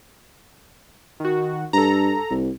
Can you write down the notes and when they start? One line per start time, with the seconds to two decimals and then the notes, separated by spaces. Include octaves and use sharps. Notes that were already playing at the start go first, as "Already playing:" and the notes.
1.20 D#3 F#4
1.73 G2 A4 A#5
2.30 C2